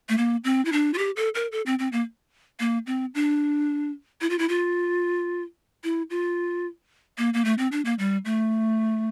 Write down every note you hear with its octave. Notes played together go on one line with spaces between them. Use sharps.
A3
A#3
C4
E4
D4
F4
G4
A4
A#4
A4
C4
C4
A#3
A#3
C4
D4
E4
F4
E4
F4
E4
F4
A#3
A#3
A3
C4
D4
A#3
G3
A3